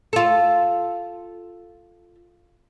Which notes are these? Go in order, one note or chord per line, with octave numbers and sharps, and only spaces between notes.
F4 A4